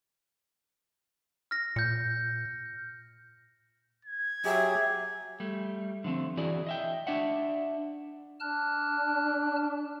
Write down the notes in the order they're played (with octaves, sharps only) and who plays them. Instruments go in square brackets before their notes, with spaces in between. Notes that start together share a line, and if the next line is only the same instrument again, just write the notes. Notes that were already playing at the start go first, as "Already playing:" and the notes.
[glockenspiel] F6 A#6
[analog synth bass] A#2 [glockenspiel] G6 C#7
[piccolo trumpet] G#6
[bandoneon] F#3 G4 G#4 [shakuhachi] E5
[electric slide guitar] G3 A3
D3 F3 A3 C4
E3 E4 F#4 G#4 D5
D#5 E5 G5
D4 D5 E5 F#5
[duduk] D4 [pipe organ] A5 F6 F#6